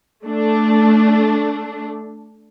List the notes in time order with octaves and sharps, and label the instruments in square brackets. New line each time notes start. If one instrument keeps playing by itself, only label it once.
[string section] A3 D4